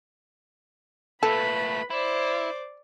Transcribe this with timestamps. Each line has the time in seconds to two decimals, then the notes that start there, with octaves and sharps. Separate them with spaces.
1.23 A#2 A3 A4 B4 B5
1.90 E4 C5 D5